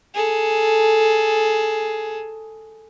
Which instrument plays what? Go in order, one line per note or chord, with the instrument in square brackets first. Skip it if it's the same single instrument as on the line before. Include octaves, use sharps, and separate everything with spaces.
[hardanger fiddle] G#4 A4